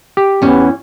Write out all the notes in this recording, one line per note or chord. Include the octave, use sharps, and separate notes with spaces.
G4
E2 B3 C#4